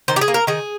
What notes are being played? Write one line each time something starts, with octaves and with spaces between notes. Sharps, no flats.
D#3 C5
G4
G#4
A#3
A#4
D#3 G#4